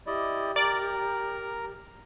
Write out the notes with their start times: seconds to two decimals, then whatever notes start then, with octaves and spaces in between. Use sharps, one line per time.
0.07 E4 G4 D5 D#5
0.56 A#4 D5 A#5